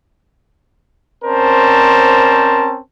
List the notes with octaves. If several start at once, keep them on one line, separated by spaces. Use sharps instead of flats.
C4 C#4 A#4 C5 D5 A5